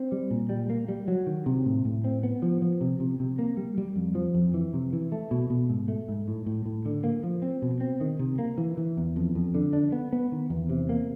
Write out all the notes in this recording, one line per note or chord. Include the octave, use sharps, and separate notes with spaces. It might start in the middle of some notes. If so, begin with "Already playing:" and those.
Already playing: C4
G3
A#2
G3
A#3
G3
F#3
D#3
C3
A2
A2
C4
B3
F3
F3
C3
C3
C3
A#3
G3
G3
F2
F3
F2
E3
C3
E3
A3
B2
B2
G#2
A3
G#2
A2
A2
A2
D3
A#3
F3
C4
B2
C4
D#3
C3
A#3
E3
E3
E2
F2
F2
D3
D4
B3
B3
D#3
E2
C3
A#3